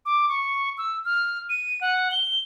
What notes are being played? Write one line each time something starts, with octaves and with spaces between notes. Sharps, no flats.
D6
C#6
E6
F6
D#7
F#5
G7